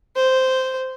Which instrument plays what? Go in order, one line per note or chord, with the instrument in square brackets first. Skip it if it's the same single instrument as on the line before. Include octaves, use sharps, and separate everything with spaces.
[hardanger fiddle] C5